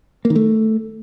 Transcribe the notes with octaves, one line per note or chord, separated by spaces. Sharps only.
A#3
D#3
A3